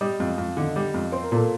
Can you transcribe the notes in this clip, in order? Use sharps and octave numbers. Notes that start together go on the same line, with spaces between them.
G3 D#5
F2
F2
D3
G3
F2
C4 C5
A#4
A#2 A4